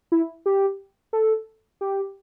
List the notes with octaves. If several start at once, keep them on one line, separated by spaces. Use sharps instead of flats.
E4
G4
A4
G4